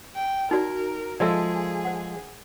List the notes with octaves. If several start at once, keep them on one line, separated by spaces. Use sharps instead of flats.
G5
D#4 F#4 A#4 D5
F3 G#3 G#4 A4 D5 E5
C5 F#5